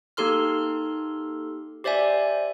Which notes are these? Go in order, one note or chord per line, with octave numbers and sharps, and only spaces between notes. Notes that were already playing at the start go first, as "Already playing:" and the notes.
A#3 D#4 G4 A4 C6 F6
G4 C5 D5 E5 G#5